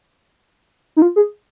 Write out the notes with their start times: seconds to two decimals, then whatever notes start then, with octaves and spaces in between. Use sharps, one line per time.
0.96 D#4
1.02 F4
1.16 G#4